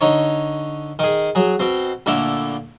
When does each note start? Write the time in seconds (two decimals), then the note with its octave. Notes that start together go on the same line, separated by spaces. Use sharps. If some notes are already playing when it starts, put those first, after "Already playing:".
0.01 D3 D#4 C#5
0.99 D#3 G#4
1.35 F#3 G#4
1.59 B2 C4
2.06 A#2 D3 A3 E4